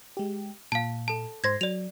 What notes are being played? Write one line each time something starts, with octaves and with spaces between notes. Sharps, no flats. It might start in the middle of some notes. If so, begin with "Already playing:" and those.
G#3 G4
A#2 F5 A5
A4 A5
G#2 C5 C6 G#6 A#6
F#3 D5 F7